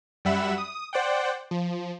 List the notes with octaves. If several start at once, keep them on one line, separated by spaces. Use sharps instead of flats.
F#2 G3 E5 F#5 B5 E7
D#6
C5 D5 F#5 G5
F3